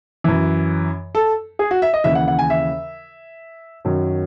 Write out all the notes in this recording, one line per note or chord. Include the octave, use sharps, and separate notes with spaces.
F#2 E3
A4
G#4
F#4
E5
D#5
D#2 C#3 E3 E5
F#5
F#5
G#5
E5
F#2 D#3 F#3